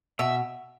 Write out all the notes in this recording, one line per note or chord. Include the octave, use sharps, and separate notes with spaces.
B2 E5